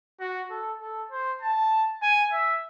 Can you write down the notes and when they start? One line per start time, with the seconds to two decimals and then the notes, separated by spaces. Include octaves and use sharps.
0.20 F#4
0.50 A4
0.81 A4
1.11 C5
1.41 A5
2.02 G#5
2.33 E5